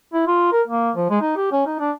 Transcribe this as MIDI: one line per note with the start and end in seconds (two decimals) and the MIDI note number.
0.13 0.24 64
0.27 0.48 65
0.52 0.62 70
0.68 0.91 58
0.96 1.09 53
1.10 1.19 56
1.21 1.34 63
1.36 1.51 67
1.52 1.64 61
1.66 1.79 63
1.80 1.91 62